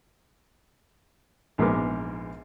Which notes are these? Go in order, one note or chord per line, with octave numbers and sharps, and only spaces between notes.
A#1 G#2 B3 A#4 D6